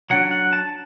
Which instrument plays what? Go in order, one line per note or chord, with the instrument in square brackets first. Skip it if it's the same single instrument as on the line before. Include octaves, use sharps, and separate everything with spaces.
[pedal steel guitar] F#3 D4 F#5
F#5
A5